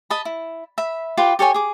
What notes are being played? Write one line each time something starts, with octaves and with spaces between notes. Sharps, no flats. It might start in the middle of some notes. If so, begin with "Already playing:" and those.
D#5 A5 B5
E4
E5 B5
F4 G4 B4 D6
G4 A4 C#5 G#5
G#4 D6